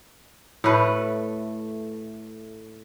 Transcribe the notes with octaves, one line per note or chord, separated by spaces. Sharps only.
A2 A3 B4